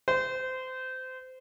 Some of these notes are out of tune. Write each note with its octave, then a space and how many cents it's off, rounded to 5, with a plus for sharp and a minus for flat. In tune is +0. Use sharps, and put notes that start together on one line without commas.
C5 -25